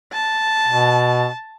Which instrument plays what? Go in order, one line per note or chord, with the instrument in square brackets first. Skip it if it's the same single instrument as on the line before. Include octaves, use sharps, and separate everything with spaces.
[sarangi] A5
[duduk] B2